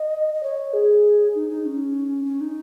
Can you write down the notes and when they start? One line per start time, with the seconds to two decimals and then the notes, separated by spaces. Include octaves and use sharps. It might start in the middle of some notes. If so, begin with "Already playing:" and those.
Already playing: D#5
0.34 D#5
0.43 C#5
0.73 G#4
1.35 D#4
1.50 D#4
1.65 C#4
2.25 C#4
2.40 D#4